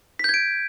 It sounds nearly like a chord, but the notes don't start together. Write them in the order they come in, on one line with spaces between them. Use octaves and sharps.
B6 G6 G#6 D7